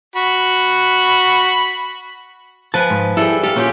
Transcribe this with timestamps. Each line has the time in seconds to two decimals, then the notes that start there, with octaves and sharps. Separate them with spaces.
0.16 F#4 B5
2.74 F3 B4 G#5 A5
2.90 G#2
3.17 G3 E4 G#4 A4
3.43 G4 A4 F5
3.56 A#2 C#4 G4